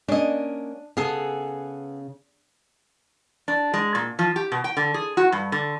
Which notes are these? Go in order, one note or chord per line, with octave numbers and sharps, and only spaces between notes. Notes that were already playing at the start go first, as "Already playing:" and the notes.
A#3 C#4 D4 D#5
C#3 B3 G#4 A4
D4
G#3
A#2
F3
G4
B2
G5
D3
G#4
F#4
G2
D3